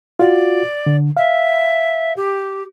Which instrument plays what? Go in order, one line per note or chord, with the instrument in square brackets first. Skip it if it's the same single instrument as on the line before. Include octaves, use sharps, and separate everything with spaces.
[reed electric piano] F4 F#4 [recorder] D5
[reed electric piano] D3
[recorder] E5 [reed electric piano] F5
[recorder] G4